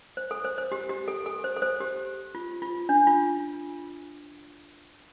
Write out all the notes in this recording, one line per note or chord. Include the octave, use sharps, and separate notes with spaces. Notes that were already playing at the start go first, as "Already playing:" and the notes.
C5
A4
C5
C5
G4
G4
A4
A4
C5
A4
C5
G4
F4
F4
D4
F4